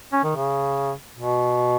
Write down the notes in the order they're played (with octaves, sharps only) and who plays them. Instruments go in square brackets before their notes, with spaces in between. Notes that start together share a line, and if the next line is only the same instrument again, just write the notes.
[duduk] C#4
D#3
C#3
B2